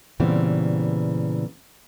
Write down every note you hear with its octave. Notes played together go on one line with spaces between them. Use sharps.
A#2 C#3 E3 G3 B3 C4